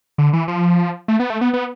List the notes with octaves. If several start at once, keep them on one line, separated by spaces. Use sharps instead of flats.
D3
E3
F3
A3
B3
A3
B3
B3